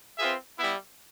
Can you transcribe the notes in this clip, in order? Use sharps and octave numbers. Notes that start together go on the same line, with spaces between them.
C4 F4 G#4 B4 E5
G3 B3 E4